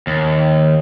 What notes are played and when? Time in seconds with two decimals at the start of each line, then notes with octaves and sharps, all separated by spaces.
0.07 D#2